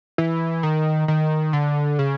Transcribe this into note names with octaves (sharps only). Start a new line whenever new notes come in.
E3
D#3
D#3
D3
C#3